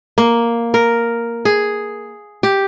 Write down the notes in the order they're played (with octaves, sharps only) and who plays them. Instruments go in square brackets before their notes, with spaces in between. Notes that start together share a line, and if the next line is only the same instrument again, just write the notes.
[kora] A#3
A#4
G#4
G4